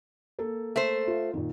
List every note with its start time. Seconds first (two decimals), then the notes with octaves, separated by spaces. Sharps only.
0.39 A#3 A4
0.76 A3 C5
1.08 F4
1.33 A#2 D#3